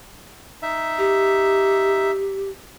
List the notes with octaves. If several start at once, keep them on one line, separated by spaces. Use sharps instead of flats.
D#4 E5
G4